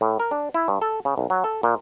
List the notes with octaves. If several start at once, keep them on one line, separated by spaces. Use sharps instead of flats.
A2
A#4
D4
E4
G2
A4
C#3
B1
F#3
A4
A#2